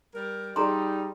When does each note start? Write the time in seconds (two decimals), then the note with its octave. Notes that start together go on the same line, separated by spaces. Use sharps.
0.14 G3 A#4
0.56 G3 D#4 G#4 D5 A#5 C6